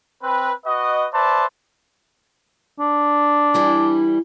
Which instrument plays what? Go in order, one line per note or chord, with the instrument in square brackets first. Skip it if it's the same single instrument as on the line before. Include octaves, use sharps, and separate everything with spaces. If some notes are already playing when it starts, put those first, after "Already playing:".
[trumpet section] C4 B4
F#4 B4 D#5
B4 C5 D5 E5 A5
[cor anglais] D4
[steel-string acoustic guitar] E3 G3 E4